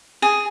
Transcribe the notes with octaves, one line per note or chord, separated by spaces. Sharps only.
G#4